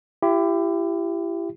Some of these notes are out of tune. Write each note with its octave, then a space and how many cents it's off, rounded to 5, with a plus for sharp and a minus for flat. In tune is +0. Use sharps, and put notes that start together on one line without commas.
E4 +35 G4 +0